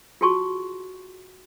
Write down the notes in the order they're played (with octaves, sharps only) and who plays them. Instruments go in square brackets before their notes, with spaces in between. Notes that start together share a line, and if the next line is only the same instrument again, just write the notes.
[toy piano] F4 F#4 G#4 A5 C6 C#6